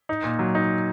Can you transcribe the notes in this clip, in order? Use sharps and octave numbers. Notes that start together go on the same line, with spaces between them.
D#4
A#2
F#3
D#4